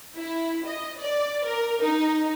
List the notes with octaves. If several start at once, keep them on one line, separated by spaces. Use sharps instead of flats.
E4
D#5
D5
A#4
D#4